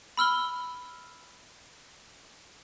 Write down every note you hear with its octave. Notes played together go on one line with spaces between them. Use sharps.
B5 E6 F6 G7